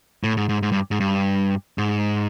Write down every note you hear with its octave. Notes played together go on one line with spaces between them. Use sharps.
A2
G#2
G#2
G#2
G2
G#2
G2
G#2